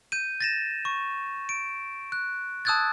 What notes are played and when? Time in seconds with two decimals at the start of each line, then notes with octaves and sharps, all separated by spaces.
0.12 G6 D#7
0.40 A6 A#6 E7
0.85 C#6
1.49 D7
2.12 F#6
2.65 A5 D#6 E6 F#6 G#6 A6